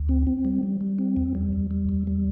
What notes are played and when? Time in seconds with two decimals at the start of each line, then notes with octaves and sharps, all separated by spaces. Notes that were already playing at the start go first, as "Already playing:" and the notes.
Already playing: D2
0.09 C4
0.27 C4
0.45 G3
0.63 G3
0.81 G3
0.99 C4
1.17 E2
1.35 G3
1.53 E2
1.71 G3
1.89 E2
2.07 G3